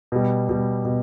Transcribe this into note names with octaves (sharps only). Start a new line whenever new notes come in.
B2 G3
B2 G3
B2